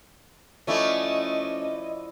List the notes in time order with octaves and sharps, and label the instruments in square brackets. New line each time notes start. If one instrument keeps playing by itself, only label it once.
[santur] F3 E4 D5 [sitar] A3 C#4 [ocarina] D#5